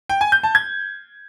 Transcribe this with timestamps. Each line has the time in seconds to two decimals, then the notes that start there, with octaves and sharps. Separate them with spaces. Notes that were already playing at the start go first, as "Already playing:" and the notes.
0.09 G5
0.21 G#5
0.32 G6
0.43 A5
0.55 G#6